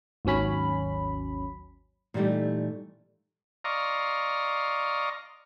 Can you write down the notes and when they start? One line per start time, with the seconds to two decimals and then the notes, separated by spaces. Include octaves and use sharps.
0.25 G#1 D#2 F#3 C#4 B5
2.14 A#2 E3 G3 A3 D#4 G4
3.64 D5 D#5 F5 A#5 C6 C#6